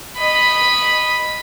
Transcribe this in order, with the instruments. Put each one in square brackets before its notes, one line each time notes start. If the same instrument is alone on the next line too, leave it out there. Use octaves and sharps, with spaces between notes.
[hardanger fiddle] D#5 B5